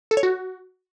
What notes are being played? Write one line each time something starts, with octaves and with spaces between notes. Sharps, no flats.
A4
C#5
F#4